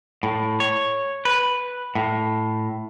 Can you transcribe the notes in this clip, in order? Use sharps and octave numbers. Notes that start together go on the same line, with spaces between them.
A2
C#5
B4
A2